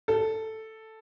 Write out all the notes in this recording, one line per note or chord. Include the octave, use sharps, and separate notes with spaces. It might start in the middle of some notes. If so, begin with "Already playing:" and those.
A4